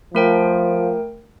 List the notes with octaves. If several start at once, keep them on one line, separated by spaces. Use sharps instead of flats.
F3 A3 A#4 G5